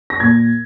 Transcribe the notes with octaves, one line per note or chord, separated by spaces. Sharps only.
A#6
A#2 G#6